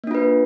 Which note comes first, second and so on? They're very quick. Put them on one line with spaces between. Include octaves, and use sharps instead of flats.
A#3 D4 F4 B4